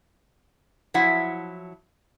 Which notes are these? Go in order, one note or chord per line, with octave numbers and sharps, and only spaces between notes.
F3 F#3 E4 F#5